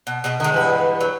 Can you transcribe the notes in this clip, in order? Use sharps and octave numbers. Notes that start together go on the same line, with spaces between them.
B2
B2 D#4 G#4
D3 G#3 F#4
E2 G2 B4
F#3